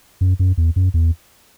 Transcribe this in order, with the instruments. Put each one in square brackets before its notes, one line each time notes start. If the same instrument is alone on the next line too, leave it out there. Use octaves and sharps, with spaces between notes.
[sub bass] F#2
F#2
E2
F#2
E2